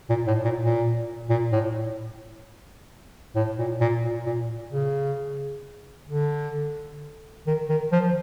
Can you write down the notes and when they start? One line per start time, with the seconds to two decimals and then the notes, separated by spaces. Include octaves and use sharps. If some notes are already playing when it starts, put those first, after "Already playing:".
0.10 A#2
0.27 A2
0.45 A#2
0.61 A#2
1.30 A#2
1.52 A2
3.36 A2
3.59 A#2
3.81 A#2
4.04 A#2
4.26 A#2
4.72 C#3
6.09 D3
7.47 D#3
7.69 D#3
7.92 F3